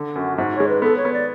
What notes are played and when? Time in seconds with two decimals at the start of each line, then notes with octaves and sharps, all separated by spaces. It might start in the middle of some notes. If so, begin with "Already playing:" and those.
Already playing: D3
0.15 F#2 F#4
0.37 G#2 F#4
0.55 G#3 C#5
0.68 B4
0.82 B3 A4
0.96 C#5
1.05 B3
1.12 D5